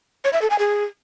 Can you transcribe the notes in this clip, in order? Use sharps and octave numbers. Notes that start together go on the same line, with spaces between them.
C#5
E5
A4
G#5
G#4